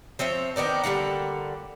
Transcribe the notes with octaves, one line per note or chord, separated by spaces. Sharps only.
F3 C4 C#5 E5
D#3 B3 D4 D#4
D3 G3 A#3 F#5